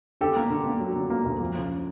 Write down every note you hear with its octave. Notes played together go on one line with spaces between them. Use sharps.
D3 G4 A4
A#3
D3
A#3
F#3
D3
A#3
D2
F2
C#3